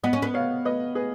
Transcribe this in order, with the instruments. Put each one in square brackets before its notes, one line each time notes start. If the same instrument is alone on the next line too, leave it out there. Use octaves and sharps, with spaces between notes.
[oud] B3 [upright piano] D#5 F#5
[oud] C#4
B3
[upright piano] C#5 F5
B4 D#5
G#4 B4